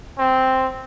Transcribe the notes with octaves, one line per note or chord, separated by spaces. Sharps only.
C4